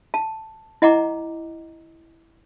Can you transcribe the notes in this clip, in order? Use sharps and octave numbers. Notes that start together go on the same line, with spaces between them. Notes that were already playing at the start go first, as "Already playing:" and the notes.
A5
E4 D#5 F#5 A#5 D6